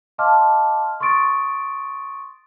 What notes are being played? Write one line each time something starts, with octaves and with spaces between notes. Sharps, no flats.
D#5 F5 A5 C6 D6 F6
C6 C#6 D#6 A6 D7